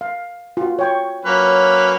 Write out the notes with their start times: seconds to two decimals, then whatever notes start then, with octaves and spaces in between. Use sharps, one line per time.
0.01 F5
0.57 F4 F#4
0.79 C#5 G5 C#6
1.25 F#3 A#3 C#4 B4